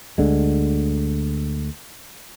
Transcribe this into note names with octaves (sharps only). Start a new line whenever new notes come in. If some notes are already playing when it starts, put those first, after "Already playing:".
D2 D3 G#3